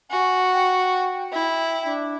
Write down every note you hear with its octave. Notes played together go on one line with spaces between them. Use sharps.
F#4 G#5
G5
E4
D4